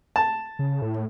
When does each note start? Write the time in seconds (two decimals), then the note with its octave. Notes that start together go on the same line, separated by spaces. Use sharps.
0.16 A5
0.59 C#3
0.82 A2